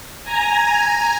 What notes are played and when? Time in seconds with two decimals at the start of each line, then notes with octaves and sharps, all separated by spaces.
0.24 G#5 A#5